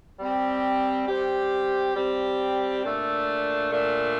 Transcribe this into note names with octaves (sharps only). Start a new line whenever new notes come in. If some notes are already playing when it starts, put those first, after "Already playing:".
G3 C4 G4
G3 C4 G4
G3 C4 G4
A#2 A3 D4
A#2 A3 D4